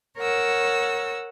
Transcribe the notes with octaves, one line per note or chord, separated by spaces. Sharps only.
A#4 C#5 F#5 E6